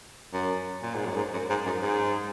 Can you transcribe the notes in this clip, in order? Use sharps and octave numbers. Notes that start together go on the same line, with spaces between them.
F#2
A#2
G#2
F#2
G#2
F#2
G#2
F#2
G#2